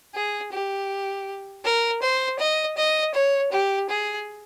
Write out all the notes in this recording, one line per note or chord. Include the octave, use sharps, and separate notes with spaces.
G#4
G4
A#4
C5
D#5
D#5
C#5
G4
G#4